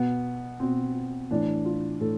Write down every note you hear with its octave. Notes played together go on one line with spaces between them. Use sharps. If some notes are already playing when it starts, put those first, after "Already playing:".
Already playing: B2 B3
B2 C4
A2 E3 D4
F4
A2 A4